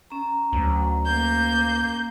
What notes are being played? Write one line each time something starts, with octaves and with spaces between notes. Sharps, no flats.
C#4 A#5
D2 F#3
A#3 G6